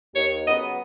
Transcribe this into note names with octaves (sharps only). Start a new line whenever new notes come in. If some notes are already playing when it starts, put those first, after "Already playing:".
D#2 C#5
C#3 F#3 B3 D#5